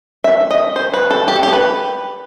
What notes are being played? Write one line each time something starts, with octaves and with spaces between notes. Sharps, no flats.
E5
D#5
C5
B4
A4
G4
A4
G4
B4